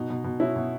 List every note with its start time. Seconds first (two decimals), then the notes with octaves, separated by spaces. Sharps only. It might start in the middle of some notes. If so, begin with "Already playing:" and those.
Already playing: B2 D#4
0.10 B2
0.24 B2
0.40 B2 C#4 E4
0.56 B2